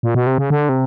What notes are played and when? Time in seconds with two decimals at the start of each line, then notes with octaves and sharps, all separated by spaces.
0.03 A#2
0.15 B2
0.27 C3
0.38 C#3
0.50 D3
0.69 C3